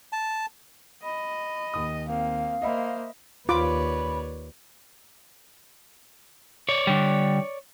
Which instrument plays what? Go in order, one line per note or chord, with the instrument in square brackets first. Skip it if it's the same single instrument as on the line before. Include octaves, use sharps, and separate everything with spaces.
[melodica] A5
[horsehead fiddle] D#5 [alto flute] B5
[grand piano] D#2 D#6
[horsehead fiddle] A#3 C4 [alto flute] F5
[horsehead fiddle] A#3 C5 [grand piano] D#5 E5 B5
[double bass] D#2 [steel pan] F4 D6 [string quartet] B4 C#5 D5 [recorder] B5
[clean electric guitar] C#5 D5
[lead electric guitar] D3 G3